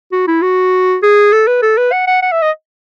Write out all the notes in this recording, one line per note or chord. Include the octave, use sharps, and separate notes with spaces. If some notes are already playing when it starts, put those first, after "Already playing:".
F#4
E4
F#4
G#4
A4
B4
A4
B4
F#5
F#5
F#5
E5
D#5